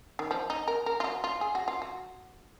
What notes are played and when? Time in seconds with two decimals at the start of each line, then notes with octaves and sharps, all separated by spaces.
0.19 D#3
0.31 F3
0.50 D#4
0.68 A#4
0.86 A#4
1.00 F4
1.04 F#4
1.24 F4
1.41 G#4
1.55 F#4
1.68 F4
1.82 F#4